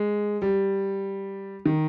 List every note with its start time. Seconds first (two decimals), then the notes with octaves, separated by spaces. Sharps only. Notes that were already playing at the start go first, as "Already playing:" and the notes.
Already playing: G#3
0.42 G3
1.66 D#3